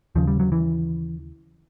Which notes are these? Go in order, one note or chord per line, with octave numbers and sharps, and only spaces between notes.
D#2 C#3 F3
G3
F#3
E3